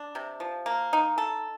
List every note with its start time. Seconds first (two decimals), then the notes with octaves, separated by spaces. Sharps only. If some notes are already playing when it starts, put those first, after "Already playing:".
Already playing: D4
0.15 C3
0.40 F3
0.66 A#3
0.93 D#4
1.18 A4